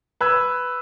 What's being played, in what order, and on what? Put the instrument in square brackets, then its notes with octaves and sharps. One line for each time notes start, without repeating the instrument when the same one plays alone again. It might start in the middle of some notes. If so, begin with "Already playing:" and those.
[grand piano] B4 E6 G#6